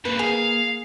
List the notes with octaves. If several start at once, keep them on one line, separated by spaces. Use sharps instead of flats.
G2 C#3 A#3 B4
G#4 F5